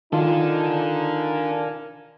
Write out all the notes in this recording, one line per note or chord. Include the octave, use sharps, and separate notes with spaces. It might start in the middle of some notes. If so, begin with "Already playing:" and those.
D#3 D4 D#4 F4 A4 A#4 F5 G#5